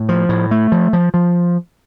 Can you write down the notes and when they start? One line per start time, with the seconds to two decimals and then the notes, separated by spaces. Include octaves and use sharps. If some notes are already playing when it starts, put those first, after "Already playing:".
Already playing: A2
0.09 F3
0.29 A2
0.51 A3
0.72 F3
0.93 F3
1.14 F3